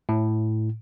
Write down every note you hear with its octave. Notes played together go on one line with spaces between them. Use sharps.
A2